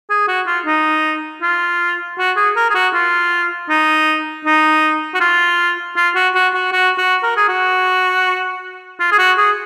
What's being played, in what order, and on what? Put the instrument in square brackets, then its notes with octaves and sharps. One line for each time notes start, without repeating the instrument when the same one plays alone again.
[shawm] G#4
F#4
F4
D#4
F4
F#4
G#4
A#4
G#4
F#4
F4
D#4
D#4
F#4
F4
F4
F#4
F#4
F#4
F#4
F#4
A#4
G#4
F#4
F4
G#4
F#4
G#4